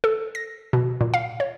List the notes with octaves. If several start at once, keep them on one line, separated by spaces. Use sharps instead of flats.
A4
A#6
B2
A#2
F5
C#5